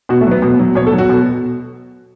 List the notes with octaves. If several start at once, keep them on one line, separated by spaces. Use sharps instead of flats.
B2 F#4
A3
F#3 B3
B2
F#3
B2 C#5
A4
F#3
F#4
B2